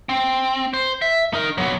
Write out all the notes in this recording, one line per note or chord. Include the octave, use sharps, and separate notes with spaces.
C4
C5
E5
D#4 A#4
F#3 B3